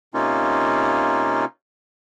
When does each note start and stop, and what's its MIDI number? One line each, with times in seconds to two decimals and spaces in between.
0.14 1.45 48
0.14 1.45 58
0.14 1.45 61
0.14 1.45 63
0.14 1.45 65